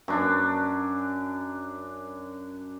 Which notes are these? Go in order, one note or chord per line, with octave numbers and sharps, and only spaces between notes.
F#2 D4